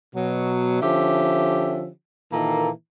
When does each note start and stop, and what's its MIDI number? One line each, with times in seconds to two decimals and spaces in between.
0.15 0.79 47
0.15 0.79 54
0.81 1.89 50
0.81 1.89 53
0.81 1.89 61
0.81 1.89 67
0.81 1.89 76
2.33 2.70 46
2.33 2.70 51
2.33 2.70 52
2.33 2.70 58
2.33 2.70 69
2.33 2.70 82